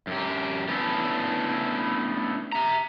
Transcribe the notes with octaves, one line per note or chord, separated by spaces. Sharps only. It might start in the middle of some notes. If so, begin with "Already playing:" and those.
F#2 G4
A3 B3 C#4 D4 E4
E5 A#5